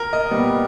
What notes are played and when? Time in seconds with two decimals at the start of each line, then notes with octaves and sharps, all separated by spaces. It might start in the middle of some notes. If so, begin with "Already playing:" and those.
Already playing: A#4
0.13 D#5
0.31 A#2 G3 B3